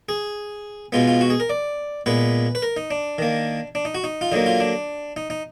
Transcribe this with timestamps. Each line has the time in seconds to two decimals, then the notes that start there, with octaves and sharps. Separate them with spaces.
0.09 G#4
0.92 B2 G#3 B3 F4
1.07 F4
1.21 F#4
1.30 G#4
1.40 A#4
1.50 D5
2.06 A#2 G#3 B3 B4
2.55 B4
2.62 A#4
2.77 D#4
2.91 D4
3.18 D#3 A#3
3.75 D4
3.85 D#4
3.95 F#4
4.04 D#4
4.21 F4
4.32 D3 F#3 A#3 D#4
4.46 F4
4.60 D4
5.17 D#4
5.30 D#4